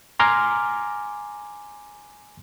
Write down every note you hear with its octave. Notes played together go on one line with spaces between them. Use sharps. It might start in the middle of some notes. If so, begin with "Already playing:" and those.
G#5 A#5 C6 D6 F6